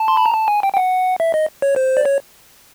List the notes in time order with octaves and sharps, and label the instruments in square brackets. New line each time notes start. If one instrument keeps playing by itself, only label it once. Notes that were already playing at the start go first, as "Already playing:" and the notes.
Already playing: [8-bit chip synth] A5
C6
B5
A#5
A5
G#5
G5
G5
F#5
E5
D#5
C#5
C5
D5
C#5